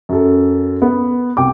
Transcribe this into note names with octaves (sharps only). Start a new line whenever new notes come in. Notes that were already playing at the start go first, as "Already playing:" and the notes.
F#2 A4
B3
C2 G5 D6